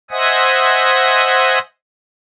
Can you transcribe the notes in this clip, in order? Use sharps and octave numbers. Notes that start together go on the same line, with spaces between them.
C5 D#5 E5 F#5 G#5 D#6